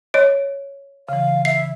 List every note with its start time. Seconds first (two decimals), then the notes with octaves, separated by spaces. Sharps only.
0.14 C#5 D#5 D7
1.09 C#3 E3 F5
1.45 E5 C7